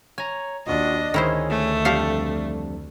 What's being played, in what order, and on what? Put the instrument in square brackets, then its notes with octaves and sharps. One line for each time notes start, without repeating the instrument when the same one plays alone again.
[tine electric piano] C#5 A#5 [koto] G#5
[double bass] D#2 D4 [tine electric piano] F4 F#4 [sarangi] D#5
[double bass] D2 [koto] D#3 E4 C5 [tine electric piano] C#4 G#4 C#5
[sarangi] A3
[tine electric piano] F2 G3 D4 [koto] G4 A4 F5